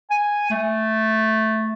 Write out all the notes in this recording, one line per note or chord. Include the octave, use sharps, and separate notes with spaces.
G#5
A3